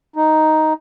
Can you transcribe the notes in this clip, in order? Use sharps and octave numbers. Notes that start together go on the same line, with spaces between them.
D#4